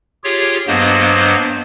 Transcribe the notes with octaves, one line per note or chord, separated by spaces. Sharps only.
F4 G4 G#4 C#5
G2 F#3 A#3 B3 C5 D#5